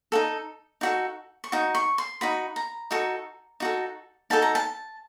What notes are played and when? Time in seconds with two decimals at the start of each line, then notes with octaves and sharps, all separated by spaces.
0.12 D#4 F#4 A4
0.81 D#4 F#4 A4
1.44 C#6
1.52 D#4 F#4
1.75 C#6
1.98 C6
2.21 D#4 F#4 B5
2.56 A#5
2.91 D#4 F#4 A4
3.60 D#4 F#4 A4
4.30 D#4 F#4 A4 A5
4.42 A#5
4.55 A5